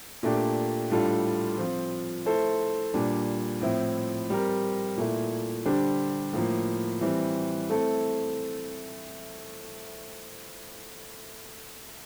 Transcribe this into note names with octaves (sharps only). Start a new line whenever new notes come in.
A#2 A3 D4 G4
A2 G3 D4 F4 A4
F3 C4 F4
A3 E4 A4 C5
A#2 G3 D4
A2 F3 C4 E4
G3 C4 G4 A#4
A#2 A3 E4
D3 G3 D4 G4 C5
A2 F3 A#3
E3 G3 C4
A3 C4 E4 A4